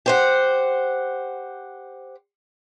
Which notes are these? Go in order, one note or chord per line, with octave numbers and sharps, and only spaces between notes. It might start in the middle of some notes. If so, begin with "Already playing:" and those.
G4 C5 F#5